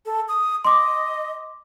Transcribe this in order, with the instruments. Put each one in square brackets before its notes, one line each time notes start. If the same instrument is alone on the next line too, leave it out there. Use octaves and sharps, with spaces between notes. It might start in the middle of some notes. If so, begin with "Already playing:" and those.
[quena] A4
D#6
[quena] D#5 [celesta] C6 D6